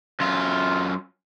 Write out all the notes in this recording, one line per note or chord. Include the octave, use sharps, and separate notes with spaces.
F#2 F4